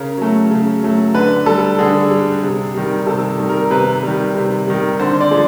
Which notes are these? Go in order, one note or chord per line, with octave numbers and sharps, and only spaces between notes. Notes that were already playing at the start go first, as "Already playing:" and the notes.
Already playing: C#3 A#4
F#3 A3
C#3
F#3 A3
D3 B4
G3 A4
D3 G#4
G3
C3
D#3 G3
C3 A4
D#3 G3
A#4
C3 B4
D#3 G3
C3
D#3 G3
D3 C5
D5
F3 G#3